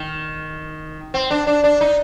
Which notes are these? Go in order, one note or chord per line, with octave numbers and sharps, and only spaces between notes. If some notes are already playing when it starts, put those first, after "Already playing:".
Already playing: D#3
C4
D4
D4
D4
D#4